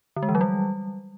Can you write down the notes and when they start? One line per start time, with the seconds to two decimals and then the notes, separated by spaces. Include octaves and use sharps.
0.16 D3
0.23 G#3
0.29 E3
0.35 F#3
0.41 G3